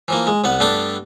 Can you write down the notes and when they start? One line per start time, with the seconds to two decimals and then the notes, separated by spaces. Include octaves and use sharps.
0.08 E3 F3 A#3
0.27 G#3
0.44 C2 B3 F#5
0.60 G2 A3 B3 D4 D6